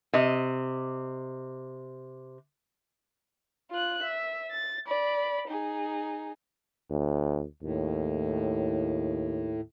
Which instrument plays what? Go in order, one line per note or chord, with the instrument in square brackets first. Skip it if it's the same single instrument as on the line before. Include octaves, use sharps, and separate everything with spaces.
[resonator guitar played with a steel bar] C3 D#5
[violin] F4 F#6
E5
A6
D5 B5
D#4 G#4
[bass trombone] D2
[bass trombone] D#2 [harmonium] A2